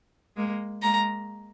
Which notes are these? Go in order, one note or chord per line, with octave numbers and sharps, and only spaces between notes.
G#3 A#3
G#3 A#3 A#5